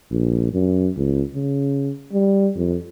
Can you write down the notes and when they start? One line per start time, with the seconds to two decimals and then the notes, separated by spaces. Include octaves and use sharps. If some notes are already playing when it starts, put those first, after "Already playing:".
0.11 A#1
0.53 F#2
0.97 C#2
1.34 C#3
2.12 G3
2.56 F2